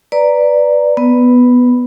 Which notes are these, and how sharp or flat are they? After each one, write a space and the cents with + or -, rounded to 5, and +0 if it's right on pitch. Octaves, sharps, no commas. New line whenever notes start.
B4 +0 D5 +0 A#5 +0
B3 +0 B4 +5